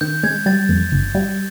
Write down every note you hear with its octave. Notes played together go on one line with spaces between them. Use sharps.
D#3 G6
G#3 G#6
G3 A6
F2
G1
G3